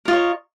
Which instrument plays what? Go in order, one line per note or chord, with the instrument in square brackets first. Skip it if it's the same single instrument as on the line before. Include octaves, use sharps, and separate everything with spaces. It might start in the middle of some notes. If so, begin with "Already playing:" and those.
[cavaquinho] A#4
F4
D#5
C#5